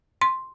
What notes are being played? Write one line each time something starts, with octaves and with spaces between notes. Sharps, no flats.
C6